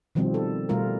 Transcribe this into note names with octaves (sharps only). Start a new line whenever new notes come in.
B2 D#3 F3 G3 C4
A4
B2 G3 A3 F4 A#4